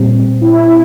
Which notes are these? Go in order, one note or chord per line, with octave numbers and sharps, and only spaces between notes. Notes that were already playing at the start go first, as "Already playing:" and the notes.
Already playing: A#2 G3 C4
E4